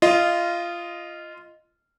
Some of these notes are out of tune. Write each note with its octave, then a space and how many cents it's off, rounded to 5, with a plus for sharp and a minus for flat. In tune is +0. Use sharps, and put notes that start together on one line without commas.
F4 -15 D#5 +0